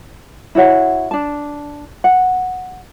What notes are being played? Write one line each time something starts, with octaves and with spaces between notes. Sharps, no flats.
E4 F#4 C#5 F#5
D4 A5
F#5